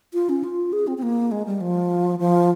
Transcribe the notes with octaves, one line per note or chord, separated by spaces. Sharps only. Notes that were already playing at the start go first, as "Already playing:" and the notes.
F4
C#4
F4
G#4
C4
C4
A#3
G#3
G3
F3
F3